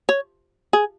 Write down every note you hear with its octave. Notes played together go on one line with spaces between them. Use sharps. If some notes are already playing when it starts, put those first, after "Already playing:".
C#5
G#4